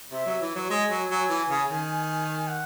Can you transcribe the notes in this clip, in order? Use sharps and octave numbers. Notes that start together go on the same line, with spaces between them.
C3 E5
F#3
E3
F#3
G#3 G#5
F#3
F#3
E3
C#3
D#3
F#5